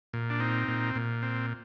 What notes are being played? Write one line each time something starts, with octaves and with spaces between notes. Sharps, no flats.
A#2
D4
C4 D#4
A#2
A#2
C4